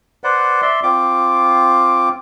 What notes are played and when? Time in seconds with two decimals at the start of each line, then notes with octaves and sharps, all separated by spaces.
0.24 B4 C5 D5 F#5
0.62 D5 E5 C6
0.83 C4 F4 D6